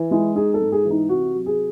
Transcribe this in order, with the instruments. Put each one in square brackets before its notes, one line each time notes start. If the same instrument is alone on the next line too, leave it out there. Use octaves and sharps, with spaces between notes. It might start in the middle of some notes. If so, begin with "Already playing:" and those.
Already playing: [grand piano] E3
[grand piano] G#3 [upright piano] E4
[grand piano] D#4 [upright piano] G#4
[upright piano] A4
[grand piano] G#2
[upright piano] G#4
[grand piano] E3
[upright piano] D#4
[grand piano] C3 [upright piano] F#4
[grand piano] F#3
[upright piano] G#4